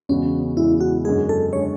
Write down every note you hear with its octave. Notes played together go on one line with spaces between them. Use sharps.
E2 C#3 G#3 B3 C#4 F#4
E2 C#3 G#3 B3 E4 F#4
F#4
F#2 D3 G#3 G#4
A4
D3 G#3 C#5